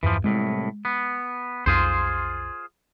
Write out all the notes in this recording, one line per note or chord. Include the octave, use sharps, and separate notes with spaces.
E2 G2 E3 F3
C2 A2 G#3
B3
B1 F2 F4 G#4 C5